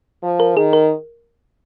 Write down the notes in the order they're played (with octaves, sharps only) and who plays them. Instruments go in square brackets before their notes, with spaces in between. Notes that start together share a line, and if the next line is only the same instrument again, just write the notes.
[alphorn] F3
[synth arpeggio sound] A#4
[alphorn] D#3 [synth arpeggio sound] G#4
[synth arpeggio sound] A#4